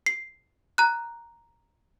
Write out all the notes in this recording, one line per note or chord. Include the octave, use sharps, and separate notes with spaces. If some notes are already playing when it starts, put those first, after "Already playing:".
C7
A#5 F#6